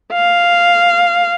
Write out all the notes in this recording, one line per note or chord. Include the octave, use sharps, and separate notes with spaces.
F5